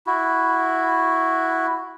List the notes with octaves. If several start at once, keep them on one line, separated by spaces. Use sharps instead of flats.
E4 F#4